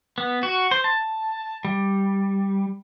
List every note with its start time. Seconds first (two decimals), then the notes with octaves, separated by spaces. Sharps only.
0.18 B3
0.43 F#4
0.71 C5
0.84 A5
1.65 G3